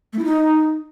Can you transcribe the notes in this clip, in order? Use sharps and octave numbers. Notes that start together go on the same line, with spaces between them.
A3
E4
D#4